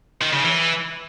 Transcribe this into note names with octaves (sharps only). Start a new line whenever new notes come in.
D#3
C#3
E3